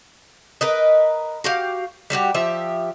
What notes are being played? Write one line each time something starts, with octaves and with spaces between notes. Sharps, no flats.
A#4 B4 D#5
F#4 G4 F5
G3 A3 F#4 G4
F3 G4 E5